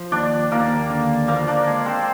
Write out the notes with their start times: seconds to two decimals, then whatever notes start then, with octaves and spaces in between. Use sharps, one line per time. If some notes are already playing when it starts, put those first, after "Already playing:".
Already playing: F3
0.12 D#2 D4 D5
0.51 D#2 A#3 A#4
0.90 D3
1.28 F3 A#3 A#4
1.47 D4 D5
1.67 G#3
1.86 C4 C5